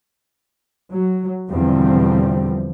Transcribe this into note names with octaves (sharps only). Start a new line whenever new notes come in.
F#3
E2 B2 D3 F3 G3 C4